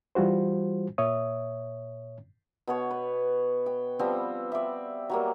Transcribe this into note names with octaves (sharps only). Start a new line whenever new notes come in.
E3 G3 F4 F#4 C5
A#2 C#5 E5 D#6
B2 B3 C#5
B4
G5
F3 G3 B3 C4
D5 E5
F#3 G3 A#3